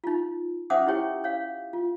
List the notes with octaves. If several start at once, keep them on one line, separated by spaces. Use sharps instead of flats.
D#4 F4
C#4 C5 E5 F#5 D6 D#6
E4 G4 C#5 G5
C#5 F5
F4